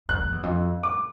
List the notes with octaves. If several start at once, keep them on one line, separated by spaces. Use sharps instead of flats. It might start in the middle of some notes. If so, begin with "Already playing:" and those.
F#2 F#6
F2
E2
F2
D6